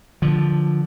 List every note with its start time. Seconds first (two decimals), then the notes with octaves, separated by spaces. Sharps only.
0.22 D3 F3